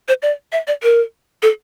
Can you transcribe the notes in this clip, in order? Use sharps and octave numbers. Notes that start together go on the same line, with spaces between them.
C5
D5
E5
D5
A#4
A4